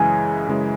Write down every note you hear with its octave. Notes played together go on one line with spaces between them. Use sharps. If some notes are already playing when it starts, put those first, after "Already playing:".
Already playing: F#2 C#3 E3 G#3 G#5
F#2 C#3 E3 G#3